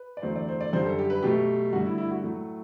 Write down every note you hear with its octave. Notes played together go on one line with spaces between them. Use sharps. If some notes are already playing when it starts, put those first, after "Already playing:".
Already playing: B4
D5
E2 D3 F#3 A3 C5
D5
C5
D5
F#2 D3 G3 C5
A4
G4
B4
B2 F#3 A3 G4
G2 D3 A3 F#4
E4
E4
F#4
A2 F#3 A3